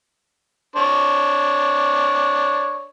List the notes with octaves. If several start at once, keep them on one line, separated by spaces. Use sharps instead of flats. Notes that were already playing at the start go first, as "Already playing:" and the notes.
D4 C#5